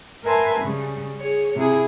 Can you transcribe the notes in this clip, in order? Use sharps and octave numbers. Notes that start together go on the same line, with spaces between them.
A#4 B4 E5 G#5 A5 C6
C#3 G3
G#4 C#5
C3 E4 G#4